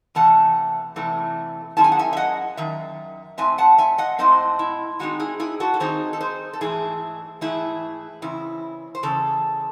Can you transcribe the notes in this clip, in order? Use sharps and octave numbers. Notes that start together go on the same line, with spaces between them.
E2 C3 E3 A3 F#5 A5
E2 C3 E3 A3
F#2 D#3 G#3 C#4 E4 A5
G#5
F#5
E5 G#5
E5
D#5 F#5
F#2 D#3 E5
A2 G#3 C4 E5 G#5
F#5 A5
E5 G#5
D#5 F#5
A2 G#3 C4 C5 D#5
E4
D#3 G#3 C4 D#4 F#4
E4 G#4
E4 G#4
F#4 A4
A4
D#3 G#3 C4 D#4 G#4 C5
A4
G#4 C5
A4
G#2 E3 A3 E4 G#4
G#2 E3 A3 E4 G#4
E2 C#3 C4 E4
C5
E2 C#3 A4